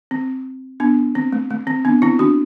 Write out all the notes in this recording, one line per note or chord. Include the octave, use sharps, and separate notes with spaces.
C4
B3 D4
C4
A3
A3
C4
B3 D4
C4 E4
D4 F#4